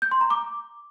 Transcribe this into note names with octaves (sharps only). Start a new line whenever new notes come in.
G6
C6
A#5
D6